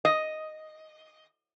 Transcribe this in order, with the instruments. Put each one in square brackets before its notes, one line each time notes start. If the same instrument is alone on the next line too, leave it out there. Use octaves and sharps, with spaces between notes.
[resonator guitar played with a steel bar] D#5